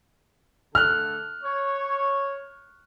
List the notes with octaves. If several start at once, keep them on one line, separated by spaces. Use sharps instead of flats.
D3 A3 A4 F6 F#6
C#5